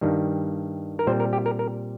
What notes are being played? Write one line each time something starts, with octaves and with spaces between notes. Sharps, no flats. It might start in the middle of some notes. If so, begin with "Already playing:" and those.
G2 D#3 G3
A#4
A#2 G3 C4 C5
A#4
G4
A#4
A#4